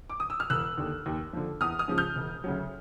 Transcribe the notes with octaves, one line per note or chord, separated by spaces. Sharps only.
D6
D#6
E6
F6
E1 E6 F#6
D#2 D3
D#2
D3 F3
E2 D#6 F6
D#6 F6
C#3 F3 G#3
F6 G6
E1
D2 C#3 F#3